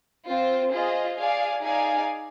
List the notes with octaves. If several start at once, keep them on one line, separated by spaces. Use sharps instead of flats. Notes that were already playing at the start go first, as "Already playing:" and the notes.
C4 F4 C5
F4 G#4 C5 D#5
G#4 D5 F5 G#5
D#4 G#4 D5 F5 G#5